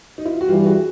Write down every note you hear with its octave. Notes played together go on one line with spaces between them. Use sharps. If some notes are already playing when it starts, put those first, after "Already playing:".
D#4
E4
F4
F#4
G2 E3 G3 F4 G4
F#4 G#4